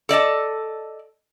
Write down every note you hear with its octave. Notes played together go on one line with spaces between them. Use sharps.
A4 D5 D#5 A5